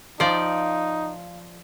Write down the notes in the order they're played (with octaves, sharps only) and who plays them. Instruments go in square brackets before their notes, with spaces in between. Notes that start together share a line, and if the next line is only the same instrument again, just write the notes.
[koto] F3 D5 [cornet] D#4 [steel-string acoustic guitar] F5